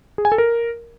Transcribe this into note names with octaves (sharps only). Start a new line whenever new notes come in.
G#4
G#5
A4
A#4